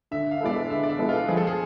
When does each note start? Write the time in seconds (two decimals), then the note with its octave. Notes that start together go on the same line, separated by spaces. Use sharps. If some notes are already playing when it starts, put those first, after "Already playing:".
0.11 D3 E5
0.31 F5
0.41 G#3 B3 E4 A4 D5
0.51 E5
0.70 D3 E5
0.83 D5
0.89 E5
0.99 G#3 B3 E4 A4
1.09 F4
1.28 F3 G#4
1.37 A4
1.47 G#4